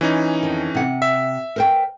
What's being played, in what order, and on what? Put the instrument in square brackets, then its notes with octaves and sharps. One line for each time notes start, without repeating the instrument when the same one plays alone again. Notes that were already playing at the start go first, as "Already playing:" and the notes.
[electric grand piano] E3 C#4 D#4
[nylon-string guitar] F2 D#3
C3 F#5
[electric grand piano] E5
[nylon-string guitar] A#4 C5 G5